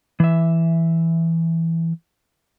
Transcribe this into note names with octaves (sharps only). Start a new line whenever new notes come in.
E3 E5